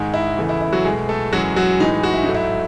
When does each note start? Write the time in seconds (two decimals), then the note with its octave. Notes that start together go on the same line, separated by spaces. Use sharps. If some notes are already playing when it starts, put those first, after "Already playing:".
Already playing: G#2 D#3 G#3
0.14 E4
0.37 E2 C#3 E3 A3
0.49 E4
0.61 E4
0.73 F#3 F#4
0.85 G#3 A3 G#4
0.88 B2
1.09 A3 A4
1.32 F#2 E3 F#3 G#3 F#4
1.56 F#3 F#4
1.80 A2 E3 G#3 D#4
2.03 F#4
2.14 E4
2.24 G#2 F#3 A3 D#4
2.34 E4